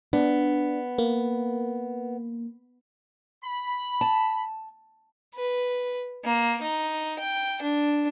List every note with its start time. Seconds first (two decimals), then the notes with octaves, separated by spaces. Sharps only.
0.13 B3 D4
0.98 A#3
3.43 B5
4.01 A5
5.35 B4
6.24 A#3
6.62 D#4
7.19 G5
7.62 D4